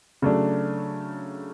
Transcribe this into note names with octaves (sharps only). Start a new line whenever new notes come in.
C#3 F#3 A3 D4